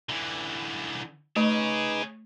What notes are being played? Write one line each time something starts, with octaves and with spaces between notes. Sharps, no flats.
D3 E3
A3 D#4 G#4 B4 C#5 D6